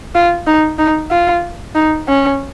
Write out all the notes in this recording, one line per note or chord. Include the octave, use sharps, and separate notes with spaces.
F4
D#4
D#4
F4
D#4
C#4